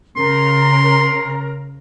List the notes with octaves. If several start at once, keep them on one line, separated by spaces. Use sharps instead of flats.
C#3 A#4 C6